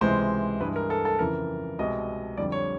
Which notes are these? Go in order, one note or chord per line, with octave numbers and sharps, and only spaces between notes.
C#2 C3 E3 G#3 C5
G2 E3 G#3 B4
A#4
A4
A4
F2 C#3 E3 A#4
C2 B2 G#3 D#5
F2 D3 G3 D5
C#5